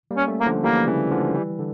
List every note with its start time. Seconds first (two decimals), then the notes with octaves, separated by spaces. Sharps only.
0.11 G3 A#3
0.17 C#4
0.28 A3 C#4
0.40 A#3
0.46 D3 F3
0.64 E3 G3 A#3
0.87 C#3 E3
1.11 D3 F3
1.35 E3 G3
1.59 D3